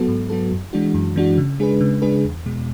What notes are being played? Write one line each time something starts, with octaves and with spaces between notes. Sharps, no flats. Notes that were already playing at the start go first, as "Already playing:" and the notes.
Already playing: F#3 B3 F#4 A4
G#2
F#3 B3 F#4 A4
F#2
E3 G#3 D4 F#4
F#2
E3 G#3 D4 F#4
C#3
G#3 D4 G#4 B4
C#3
G#3 D4 G#4 B4
E2
B2 G#3